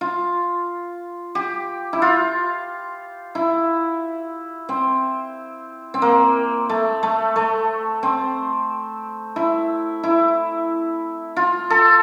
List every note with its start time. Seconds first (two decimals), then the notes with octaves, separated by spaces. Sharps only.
0.01 F4
1.35 G4
1.93 E4
2.02 F4
3.35 E4
4.69 C4
5.94 C4
6.02 A#3
6.69 A3
7.03 A3
7.36 A3
8.03 C4
9.36 E4
10.03 E4
11.36 F4
11.70 A4